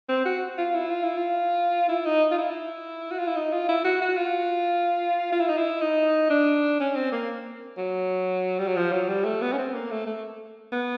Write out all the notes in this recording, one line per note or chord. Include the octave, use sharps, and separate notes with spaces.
C4
F#4
F4
E4
F4
E4
F4
E4
D#4
F4
E4
F#4
F4
E4
D#4
F4
E4
F#4
F#4
F4
F4
E4
D#4
E4
D#4
D4
C#4
C4
A#3
F#3
G3
F#3
F3
F#3
G3
A3
B3
C#4
C4
A#3
A3
A3
B3